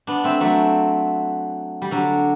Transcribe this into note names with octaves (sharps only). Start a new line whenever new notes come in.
B3 D4
A3 C4
F#3 A3
G3
D3 F#3